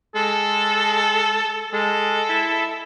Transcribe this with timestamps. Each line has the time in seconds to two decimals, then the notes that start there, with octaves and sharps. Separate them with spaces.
0.15 G#3 A4
1.73 G#3 A4
2.29 E4